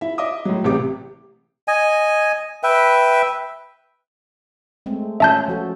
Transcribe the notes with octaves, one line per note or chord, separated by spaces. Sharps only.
E4 E5
D#5 E5 D6 D#6
A2 F#3
A1 C3 G4 D6
D#5 G#5
B4 E5 G5
G#3 A3 C4
C#4 F4 E5 A5 G6
F3 F#4 A4